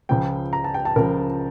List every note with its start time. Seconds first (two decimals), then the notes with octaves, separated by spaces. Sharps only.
0.09 C#2 C#3 F3 G5
0.53 A#5
0.64 A5
0.74 G5
0.85 A5
0.96 C#2 C#3 F3 A#4